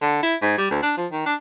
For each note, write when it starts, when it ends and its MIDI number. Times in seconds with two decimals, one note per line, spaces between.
0.01 0.20 50
0.23 0.35 64
0.42 0.54 44
0.58 0.69 55
0.71 0.79 38
0.82 0.94 62
0.97 1.07 53
1.12 1.25 51
1.26 1.35 62